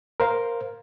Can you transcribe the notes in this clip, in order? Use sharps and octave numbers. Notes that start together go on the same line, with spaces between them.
A#4 C5 F5